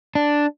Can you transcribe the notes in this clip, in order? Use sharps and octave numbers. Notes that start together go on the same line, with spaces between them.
D4